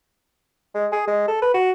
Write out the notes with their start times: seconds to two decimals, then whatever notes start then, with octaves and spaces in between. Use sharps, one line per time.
0.75 G#3
0.92 G#4
1.07 G#3
1.28 A4
1.42 B4
1.54 F#4